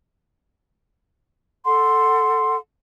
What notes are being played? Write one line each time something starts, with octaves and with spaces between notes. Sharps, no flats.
A4 F#5 C6